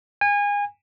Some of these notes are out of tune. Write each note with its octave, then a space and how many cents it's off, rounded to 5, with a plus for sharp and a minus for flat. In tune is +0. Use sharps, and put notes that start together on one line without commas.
G#5 -25